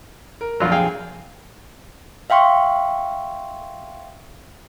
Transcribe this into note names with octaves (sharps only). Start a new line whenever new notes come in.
A#4
F1 A#1 F2 F#3 F4
G#4 F5 G5
E5 F5 G5 C6 C#6